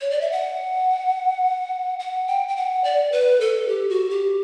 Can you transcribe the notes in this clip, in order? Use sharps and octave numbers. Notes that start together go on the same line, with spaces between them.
C#5
D5
E5
F#5
F#5
G5
G5
F#5
D5
B4
A4
G4
F#4
G4